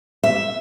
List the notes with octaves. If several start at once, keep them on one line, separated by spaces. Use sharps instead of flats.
E5